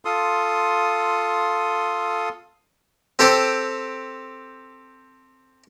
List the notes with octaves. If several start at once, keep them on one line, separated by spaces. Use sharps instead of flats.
F4 A4 C6 D#6
C4 G4 A4 C5 G5